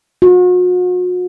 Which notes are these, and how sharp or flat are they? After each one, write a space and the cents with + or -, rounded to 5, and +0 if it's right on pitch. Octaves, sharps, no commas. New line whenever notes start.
F#4 -40